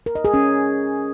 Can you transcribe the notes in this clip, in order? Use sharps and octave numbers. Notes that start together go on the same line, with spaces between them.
A#4
D#5
G#4
C#4